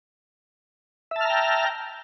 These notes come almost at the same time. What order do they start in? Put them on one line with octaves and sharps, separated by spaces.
E5 A5 F6 A#5 G5